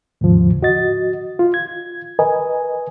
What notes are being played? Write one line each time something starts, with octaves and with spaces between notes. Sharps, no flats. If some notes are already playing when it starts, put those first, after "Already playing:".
D#2 G#2 C#3 F3
F#4 D#5 A6
F4
G#6
A#4 B4 D#5 G#5